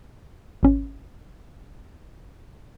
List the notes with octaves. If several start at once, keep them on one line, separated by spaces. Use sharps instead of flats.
G#1 C#4